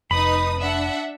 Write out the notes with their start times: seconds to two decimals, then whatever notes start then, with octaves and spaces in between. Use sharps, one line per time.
0.11 F1 D#4 B4 B5 D#6
0.60 D4 E5 F#5